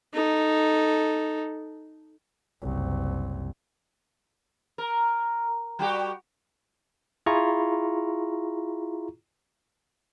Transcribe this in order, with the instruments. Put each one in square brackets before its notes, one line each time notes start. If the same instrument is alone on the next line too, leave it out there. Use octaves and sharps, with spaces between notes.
[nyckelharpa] D#4 A4
[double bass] F#1 C2
[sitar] A#4
G3 F#4 G4
[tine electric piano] E4 F4 G#4 A#5 C#6